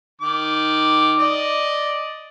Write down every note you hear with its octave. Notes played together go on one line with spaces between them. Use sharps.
D#3 D6
D5 D#5